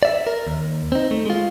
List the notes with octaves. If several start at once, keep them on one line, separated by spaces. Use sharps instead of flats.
D5 E5
A#4
D#2
C4 D#4
A3
G#3 F4